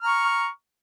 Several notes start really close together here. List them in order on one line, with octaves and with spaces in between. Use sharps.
F6 A#5 C#6